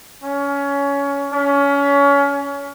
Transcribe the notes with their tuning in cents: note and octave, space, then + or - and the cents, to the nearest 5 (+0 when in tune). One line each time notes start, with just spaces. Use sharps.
C#4 +20
C#4 +25